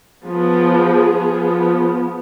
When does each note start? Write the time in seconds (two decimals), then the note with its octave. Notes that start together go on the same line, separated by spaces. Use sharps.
0.24 F3 B3 G#4
1.13 F3 B3